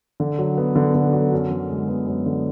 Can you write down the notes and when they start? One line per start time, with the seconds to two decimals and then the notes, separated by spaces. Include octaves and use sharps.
0.20 D3
0.38 F#3
0.57 B3
0.76 D3
0.95 D3
1.13 F#3
1.32 F#2
1.51 D3
1.70 G#3
1.88 B3
2.07 F#2
2.26 D3